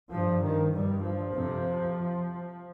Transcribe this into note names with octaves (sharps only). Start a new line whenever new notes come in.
G2 F3
D#3
G2 G3
F3
F2 C3